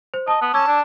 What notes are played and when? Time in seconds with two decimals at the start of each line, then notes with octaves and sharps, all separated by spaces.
0.14 C5
0.28 D#5 A5 D#6
0.42 B3
0.54 C#4 A5 D6 E6 G#6
0.67 D4